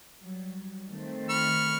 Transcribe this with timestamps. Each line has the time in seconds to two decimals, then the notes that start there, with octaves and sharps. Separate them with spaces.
0.21 F#3 G3
0.89 D#3 A3 C4
1.29 B5 C#6 F6